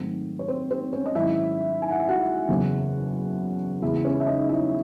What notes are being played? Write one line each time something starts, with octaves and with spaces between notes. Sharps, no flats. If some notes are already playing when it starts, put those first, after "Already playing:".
Already playing: G#2 D#3 F#3 A3 C4
C#5
C4 C5
C4 C5
C#4 C#5
D#5
G#2 D#3 F#3 C#4 E4 E5
G#5
F#5
E5
F#4 F#5
F#1 E2 C#3 F#3 C#4
E2 C#3 G#3 E4 E5
C#4 C#5
E5
D#4 D#5
E4 E5